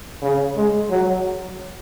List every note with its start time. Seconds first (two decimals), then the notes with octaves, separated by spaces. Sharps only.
0.22 C#3
0.56 G#3
0.90 F#3